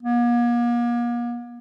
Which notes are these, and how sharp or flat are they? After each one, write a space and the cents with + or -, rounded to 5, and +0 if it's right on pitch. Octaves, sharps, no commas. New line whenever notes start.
A#3 +40